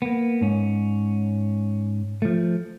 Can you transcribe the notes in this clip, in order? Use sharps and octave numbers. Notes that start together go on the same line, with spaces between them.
A#3 B3
G#2 C#4
F3 A3